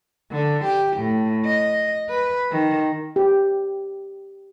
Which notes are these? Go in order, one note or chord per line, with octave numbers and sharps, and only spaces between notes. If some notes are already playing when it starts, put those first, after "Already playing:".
D3
G4
A2
D#5
B4
D#3
G4